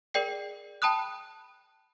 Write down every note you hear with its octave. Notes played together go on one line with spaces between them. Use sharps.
G#4 A#4 D5 G5 C7
G5 A5 B5 D#6 F#6